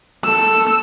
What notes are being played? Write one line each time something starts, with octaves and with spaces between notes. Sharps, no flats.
A4 E6